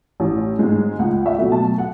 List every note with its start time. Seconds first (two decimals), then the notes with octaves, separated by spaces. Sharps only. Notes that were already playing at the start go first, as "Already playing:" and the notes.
0.20 A1
0.59 G#2 G#3
0.99 C#2 F#5
1.26 E5
1.38 B2 F#3 A3
1.52 A5
1.78 F#5